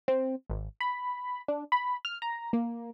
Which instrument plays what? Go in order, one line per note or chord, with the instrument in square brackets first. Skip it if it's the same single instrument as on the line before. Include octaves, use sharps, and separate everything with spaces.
[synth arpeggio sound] C4
G#1
B5
D4
B5
F6
A#5
A#3